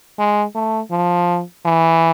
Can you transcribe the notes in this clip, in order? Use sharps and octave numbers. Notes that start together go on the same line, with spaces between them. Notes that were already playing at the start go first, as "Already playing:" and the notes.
G#3
A3
F3
E3